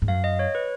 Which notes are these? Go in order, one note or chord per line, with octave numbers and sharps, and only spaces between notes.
G#2
F#2 F5
D#5
C#5
B4